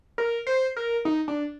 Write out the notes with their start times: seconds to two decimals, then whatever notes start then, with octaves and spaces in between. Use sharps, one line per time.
0.18 A#4
0.47 C5
0.76 A#4
1.05 D#4
1.28 D4